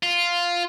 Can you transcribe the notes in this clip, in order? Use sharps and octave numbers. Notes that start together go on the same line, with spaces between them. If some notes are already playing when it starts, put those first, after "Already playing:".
F4